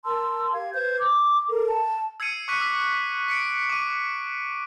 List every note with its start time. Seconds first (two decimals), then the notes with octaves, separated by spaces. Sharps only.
0.05 A#4 A5 C6 E6
0.53 G4 F5 G#6
0.73 B4 C5 G6 G#6
1.00 D6
1.49 A4 A#4
1.67 A5
2.20 E6 G#6 C7 C#7 D#7
2.48 C#6 D6 F#6 B6 C#7 D#7
2.60 D6 E6 B6
3.29 B6 C#7 D7
3.69 D6 D#7